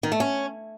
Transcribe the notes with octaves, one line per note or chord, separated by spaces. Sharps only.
D#3
A3
C#4